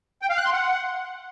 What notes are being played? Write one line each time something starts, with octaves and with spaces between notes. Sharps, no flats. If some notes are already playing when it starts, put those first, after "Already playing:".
G5
F5
F#6
C6
F#5